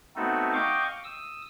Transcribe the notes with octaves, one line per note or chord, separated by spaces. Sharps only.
A3 B3 C4 D#4 F#4 A4
D#5 F5 G5 C#6 D6
D#6 E6